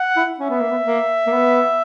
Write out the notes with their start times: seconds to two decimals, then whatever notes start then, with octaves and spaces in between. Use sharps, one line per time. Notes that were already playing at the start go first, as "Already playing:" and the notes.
Already playing: F#5
0.17 E4
0.39 C#4 E5
0.50 B3
0.61 A#3
0.71 B3
0.86 A#3
1.27 A#3
1.32 B3